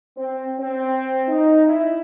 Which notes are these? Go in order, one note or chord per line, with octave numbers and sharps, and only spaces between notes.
C4
C4
D#4
E4